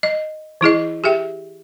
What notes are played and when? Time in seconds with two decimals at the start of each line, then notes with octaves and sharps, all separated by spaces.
0.03 D#5
0.61 E3 E4 G#4 D#5
1.04 G4 G#4 E5 G5